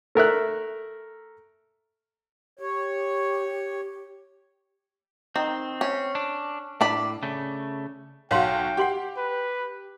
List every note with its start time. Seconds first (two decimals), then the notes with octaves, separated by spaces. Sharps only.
0.15 A3 A#4 E5 F#6
2.59 G4 C#5
5.36 D#3 C4
5.81 C#4
6.15 D4
6.81 A2 D4 D5 B5
7.23 C#3 A3
8.31 B1 F#4 C#5 F5 G5 C6
8.77 G4 F#5 C6 C#6
9.17 B4